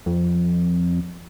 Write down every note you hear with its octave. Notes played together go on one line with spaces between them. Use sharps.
F2